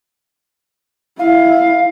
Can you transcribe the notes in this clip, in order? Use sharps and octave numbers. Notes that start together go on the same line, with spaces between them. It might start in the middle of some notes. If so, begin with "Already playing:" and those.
E4 F5